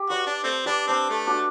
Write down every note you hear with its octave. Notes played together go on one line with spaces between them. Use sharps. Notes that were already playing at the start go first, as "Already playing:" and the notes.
Already playing: G4
F#4 B4 D5
D4
A3 C4
D4 G4 B4
C4 D4
A3
D4 F#4